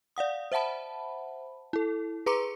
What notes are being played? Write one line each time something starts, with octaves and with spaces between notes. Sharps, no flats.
D5 F5 F#5 D#6
C5 E5 F#5 A5 B5
E4 A4
G#4 B4 A#5 C6 D6 C#7